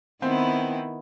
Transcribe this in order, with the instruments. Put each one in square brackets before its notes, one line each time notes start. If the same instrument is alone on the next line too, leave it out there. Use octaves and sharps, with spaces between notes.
[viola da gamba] D#3 B3 E4 [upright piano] C4